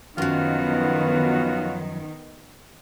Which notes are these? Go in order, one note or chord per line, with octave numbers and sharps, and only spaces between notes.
F#2 D#3 F3 B3 C#4 F4 F#4